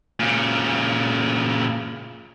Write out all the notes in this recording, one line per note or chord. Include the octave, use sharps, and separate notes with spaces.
A#2 C#3